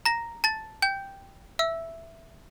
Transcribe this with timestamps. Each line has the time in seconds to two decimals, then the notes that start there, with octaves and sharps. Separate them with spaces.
0.06 A#5 A#6
0.44 A5 A6
0.82 G5 G6
1.59 E5 E6